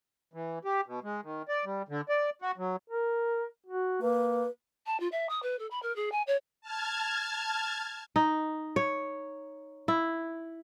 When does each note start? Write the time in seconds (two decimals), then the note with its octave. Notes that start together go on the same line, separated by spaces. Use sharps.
0.34 E3
0.65 G4
0.86 B2
1.03 G#3
1.23 D#3
1.48 D5
1.65 G3
1.89 D3
2.09 D5
2.42 F#4
2.58 F#3
2.90 A#4
3.66 F#4
4.02 A#3 B4
4.86 A5
5.00 F4
5.11 E5
5.29 D#6
5.42 B4
5.58 A4
5.70 B5
5.82 A#4
5.95 G#4
6.11 G#5
6.27 C#5
6.61 A5 F6 G#6
8.16 D#4
8.76 C#5
9.88 E4